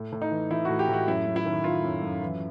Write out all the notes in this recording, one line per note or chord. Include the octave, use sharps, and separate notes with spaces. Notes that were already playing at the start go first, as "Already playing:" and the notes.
Already playing: A2
A2
D#4
E3
E3 E4
F#4
A2
G4
A2 F#4
F#2 E4
F#2
E4
D#3
D#3 F4
F#2
F#2
E3